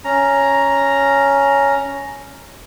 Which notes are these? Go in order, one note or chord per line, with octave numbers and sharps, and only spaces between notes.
C#4 A#5